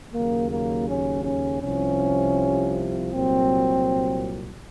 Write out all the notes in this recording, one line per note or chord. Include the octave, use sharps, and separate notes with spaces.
D#2 C#3 F#3 A#3
A#3
C#4
C#4
C2 C3 F3 C#4
C2 A#2 F#3 C4